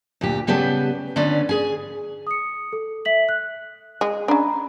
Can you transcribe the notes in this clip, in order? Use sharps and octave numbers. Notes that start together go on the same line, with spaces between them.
D2 A#2 G4
C#3 G3 B3 G4 B4 A5
D3 B3 C#4 B4 D5
G#4 G#5
D#6 C#7
A4
E5 B6 F#7
F#6
G#3
C#4 D4 A#5 B5